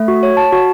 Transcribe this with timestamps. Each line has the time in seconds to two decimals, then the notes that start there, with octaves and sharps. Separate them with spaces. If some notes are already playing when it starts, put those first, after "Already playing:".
Already playing: A3
0.08 F#4
0.23 C#5
0.37 A5
0.52 F#4